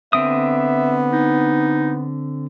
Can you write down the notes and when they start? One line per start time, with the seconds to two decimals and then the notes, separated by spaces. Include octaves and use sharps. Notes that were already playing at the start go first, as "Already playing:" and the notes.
0.13 D3 B3 C4 E5 D#6
1.13 D#4